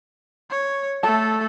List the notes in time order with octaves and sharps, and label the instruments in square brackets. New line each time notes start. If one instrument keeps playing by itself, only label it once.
[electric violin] C#5
[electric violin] A3 A4 [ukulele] A5